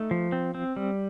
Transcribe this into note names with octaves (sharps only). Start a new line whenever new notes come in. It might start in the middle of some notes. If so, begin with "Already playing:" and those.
Already playing: A3 D#4
F3
C4
C4
G3